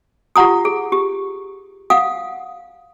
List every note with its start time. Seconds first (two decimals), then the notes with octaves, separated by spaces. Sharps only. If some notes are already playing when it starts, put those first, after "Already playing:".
0.36 F4 G4 F#5 A#5 D#6
0.65 G#4
0.92 G4
1.90 F5 F#5 D#6